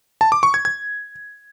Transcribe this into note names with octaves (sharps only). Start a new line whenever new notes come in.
A5
D6
C#6
G#6
G#6